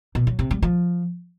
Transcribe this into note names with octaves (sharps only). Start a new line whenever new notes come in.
B2
F#3
C3
G3
F3